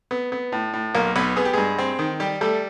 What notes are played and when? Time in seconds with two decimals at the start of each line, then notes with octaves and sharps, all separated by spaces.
0.11 B3
0.32 B3
0.52 A2
0.74 A2
0.95 B1 A#3 A#4
1.16 B1 B3 B4
1.36 B3 G#4
1.45 G4
1.53 G2 G#3 G#4
1.78 C4
1.99 D#3
2.20 G3 G4
2.41 G3 A3 A4